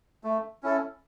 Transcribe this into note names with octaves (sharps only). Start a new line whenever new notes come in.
A3
C#4 E4 A4